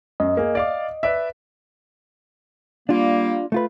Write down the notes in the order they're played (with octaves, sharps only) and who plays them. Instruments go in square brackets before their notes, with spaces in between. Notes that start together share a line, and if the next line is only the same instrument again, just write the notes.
[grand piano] F#2 [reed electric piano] D#5
[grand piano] A#3 G#4
D5 F5 D6
B4 D5 E5
[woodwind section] G3 A#3 [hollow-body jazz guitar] D4 F4
[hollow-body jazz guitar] A3 F4 B4